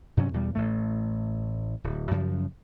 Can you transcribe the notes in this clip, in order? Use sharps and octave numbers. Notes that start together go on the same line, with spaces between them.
G2 C3 F#3 C#4
E2 B2 G3
A1 A2 A3
D1
F#2 C#3 F3